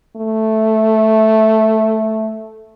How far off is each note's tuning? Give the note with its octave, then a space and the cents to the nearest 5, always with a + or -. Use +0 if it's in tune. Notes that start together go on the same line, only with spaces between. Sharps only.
A3 -5